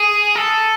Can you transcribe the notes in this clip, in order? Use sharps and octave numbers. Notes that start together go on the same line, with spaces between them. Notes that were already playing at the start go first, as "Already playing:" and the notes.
Already playing: G#4
A4